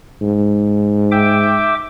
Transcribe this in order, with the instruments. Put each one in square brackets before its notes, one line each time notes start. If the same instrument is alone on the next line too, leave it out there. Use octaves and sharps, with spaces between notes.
[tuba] G#2
[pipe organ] E5 G5 D6